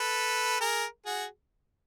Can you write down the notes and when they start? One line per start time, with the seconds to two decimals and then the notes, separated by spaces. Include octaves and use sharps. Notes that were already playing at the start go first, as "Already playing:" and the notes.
Already playing: A4 B4
0.60 G#4 A#4
1.06 F#4 G#4